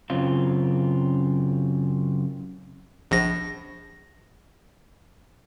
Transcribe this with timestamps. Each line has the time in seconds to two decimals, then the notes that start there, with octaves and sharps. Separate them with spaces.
0.10 F#2 C#3 C4 F4
3.11 A#1 A#6